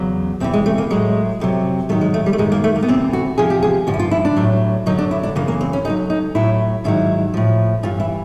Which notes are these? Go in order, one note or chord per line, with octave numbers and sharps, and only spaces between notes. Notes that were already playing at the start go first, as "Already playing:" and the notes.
Already playing: E2 C#3 F#3
E2 C3 E3 C4
G#3
A3
A#3
A2 F#3 G#3
F2 C3 D#3 F#3
G#2 D#3 F#3 A3
G#3
A3
G3
A3
F#2 D#3 F#3 G#3
A#3
A3
A#3
B3
D2 C3 E3 C4
F#4
E2 C3 F3 G#4
G4
G#4
G2 D3 F3 F#4
E4
F4
E4
D4
A2 F#3
F#2 D3 F#3 D#4
D4
E4
D4
F#2 C#3 E3 A#3
A#3
C4
C#4
D2 D3 F#3 D#4
D#4
A2 F#3 E4
G#2 D#3 F#3 E4
A2 F3
G2 E3 F4
E4